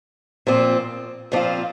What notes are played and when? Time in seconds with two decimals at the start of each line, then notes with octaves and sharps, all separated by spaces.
0.47 A#2 F3 C4 F4
1.32 A#2 F3 C4 F4